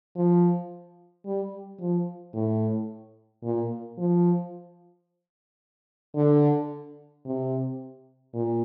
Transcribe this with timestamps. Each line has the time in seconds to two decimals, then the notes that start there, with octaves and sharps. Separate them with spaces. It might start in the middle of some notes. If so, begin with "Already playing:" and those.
0.16 F3
1.26 G3
1.80 F3
2.34 A2
3.43 A#2
3.98 F3
6.15 D3
7.25 C3
8.34 A#2